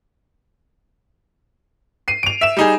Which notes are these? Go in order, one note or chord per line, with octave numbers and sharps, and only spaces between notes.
C7 D#7
D7 F7
E5 E7
G3 D#4 G#4